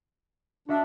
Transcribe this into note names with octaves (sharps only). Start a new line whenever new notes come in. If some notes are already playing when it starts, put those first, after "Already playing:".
D4 F#4 D#5 E5